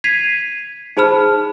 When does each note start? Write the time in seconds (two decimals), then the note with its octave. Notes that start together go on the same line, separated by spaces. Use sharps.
0.04 G#6 B6 C7 D#7 F7
0.97 D#4 G#4 C5 A5 B5 F6